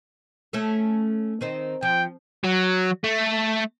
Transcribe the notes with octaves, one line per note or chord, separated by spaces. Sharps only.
A3 C#4 A4
D#3 C4 D#4
F3 G5
F#3
A3